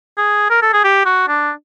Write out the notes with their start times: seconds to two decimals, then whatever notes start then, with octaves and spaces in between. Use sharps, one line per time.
0.18 G#4
0.50 A#4
0.62 A4
0.73 G#4
0.84 G4
1.06 F#4
1.28 D4